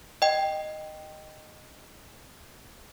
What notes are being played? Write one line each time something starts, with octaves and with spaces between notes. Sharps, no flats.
D#5 G5